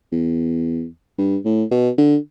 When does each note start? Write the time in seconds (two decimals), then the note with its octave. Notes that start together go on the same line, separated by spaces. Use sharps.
0.12 E2
1.18 G2
1.45 A2
1.71 B2
1.98 D3